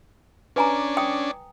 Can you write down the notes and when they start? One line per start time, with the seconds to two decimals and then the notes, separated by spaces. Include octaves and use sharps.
0.56 C#4 D4 B4 G#5 A#5
0.97 G5 D#6